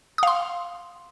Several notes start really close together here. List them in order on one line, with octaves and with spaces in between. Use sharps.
D#6 F5 C6